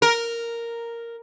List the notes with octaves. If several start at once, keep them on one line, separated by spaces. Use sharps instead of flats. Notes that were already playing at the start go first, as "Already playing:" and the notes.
A#4